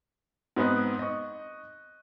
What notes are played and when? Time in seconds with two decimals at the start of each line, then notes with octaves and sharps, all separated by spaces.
0.56 G#2 B3 C4 D#4 F#6
0.99 D#5 C#6